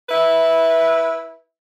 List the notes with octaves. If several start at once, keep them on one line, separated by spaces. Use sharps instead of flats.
E4 B4 E5